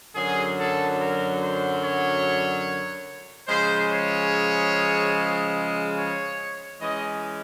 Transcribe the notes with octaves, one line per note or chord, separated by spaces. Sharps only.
F#2 D3 F#3 G#4
A4
A#4
C5
C#5
C#3 F3 G#3 C5
C#5
C#5
E3 G#3 C#4 D#5